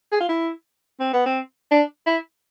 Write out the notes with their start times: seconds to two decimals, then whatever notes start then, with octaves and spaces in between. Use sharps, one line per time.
0.12 G#4
0.20 F4
0.29 E4
1.00 C4
1.13 B3
1.26 C4
1.71 D4
2.06 E4